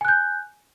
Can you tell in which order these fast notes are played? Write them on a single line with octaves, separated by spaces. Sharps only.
G#5 F#6 G6